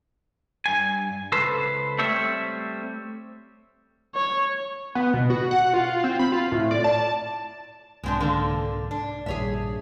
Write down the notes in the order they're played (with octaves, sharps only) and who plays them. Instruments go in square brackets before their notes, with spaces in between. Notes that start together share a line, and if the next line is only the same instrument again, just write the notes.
[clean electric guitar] G2 G#5
C#2 A4 B4 C5
G3 A3 C4 C#5 E5
[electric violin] C#5
[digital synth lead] B3
B2
F#4
F#5
F4
C4
B5
F4
A2
D5
A5
[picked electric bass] C2 G#2 [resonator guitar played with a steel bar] G#3 C4 D4
[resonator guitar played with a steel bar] D3 A#3 A4
D4
[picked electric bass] A#1 G2 [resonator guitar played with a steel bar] G#4 C#5 E5